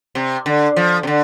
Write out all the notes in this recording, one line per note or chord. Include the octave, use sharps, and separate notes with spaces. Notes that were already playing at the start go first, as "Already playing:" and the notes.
C3
D3
F3
C3
D3